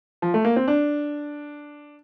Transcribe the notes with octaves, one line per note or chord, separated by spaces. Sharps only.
F3
A3
A#3
C4
D4